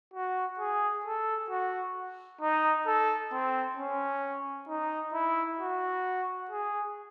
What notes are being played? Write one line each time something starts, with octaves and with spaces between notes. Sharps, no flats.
F#4
G#4
A4
F#4
D#4
A4
C4
C#4
D#4
E4
F#4
G#4